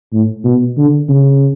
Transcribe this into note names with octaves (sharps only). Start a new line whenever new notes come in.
A2
B2
D3
C#3